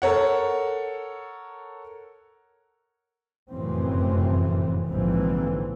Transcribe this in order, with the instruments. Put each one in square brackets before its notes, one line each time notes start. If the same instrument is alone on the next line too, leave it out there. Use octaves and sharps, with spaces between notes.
[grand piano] A4 A#4 C#5 F#5
[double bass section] F1 F#2 A2 C#3 E3 C4
A#1 G#2 D3 E3 F3 C4